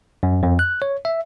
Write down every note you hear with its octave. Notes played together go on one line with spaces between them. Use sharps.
F#2
F2
F#6
C#5
E5